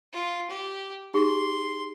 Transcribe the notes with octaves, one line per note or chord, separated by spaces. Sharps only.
F4
G4
D#4 G4 G#4 C6